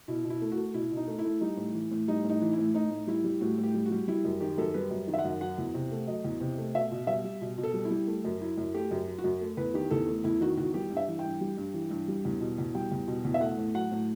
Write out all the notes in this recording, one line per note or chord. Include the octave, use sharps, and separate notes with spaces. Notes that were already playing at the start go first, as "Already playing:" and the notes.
B2 E4
B2
E4
A3
F#4
A3
B2 E4
B2
D#4
A3
E4
A3
G3 D#4
A2
E3
A2
G3 D#4
A2
D#4
E3
E4
A2
A2 D#4
A2
G3 E4
G3
A2 F#4
A2
G4
G3
F#4
G3
G3 E4
F#2
D#3 G4
F#2 A4
G3 B4
F#2
D#3
E5
F#5
F#2
F#3 F#5
E2
C3
A3
F#3 D#5
E2
C3
A3
B2 E5
B2
G3 E5
G3
B2
B2
A4
G3
E4
G3
A3
F#2
F#3 E4
F#2
A3 G4
F#2
F#3
F#4
F#2
A3
E2 B4
D#3 G4
E2 A4
A3
E2 E4
D#3 F#4
E2 F#4
G3 G4
G2
E5
E3
G5
G2
G3
G2
E3
G2
G3
E2
B2
E2
G3 G5
E2
B2
E2
E5
A3 F#5
A2
F#3 F#5
A2